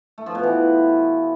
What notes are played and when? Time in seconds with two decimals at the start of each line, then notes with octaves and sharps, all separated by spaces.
0.18 A3
0.26 F3
0.35 B2
0.43 E3